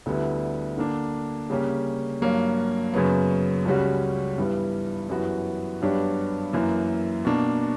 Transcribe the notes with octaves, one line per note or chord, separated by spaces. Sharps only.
D2 D3 G3 B3 E4
D3 A#3 D4
C#3 G3 A#3 C#4 G4
G2 F#3 A#3
F#2 C#3 F#3 B3
C#2 C#3 G3 C#4 F#4
G2 E3 G3 B3
F#2 E3 G3 B3 F#4
G2 F#3 B3 D4 G4
F#2 E3 A#3
B2 A#3 D4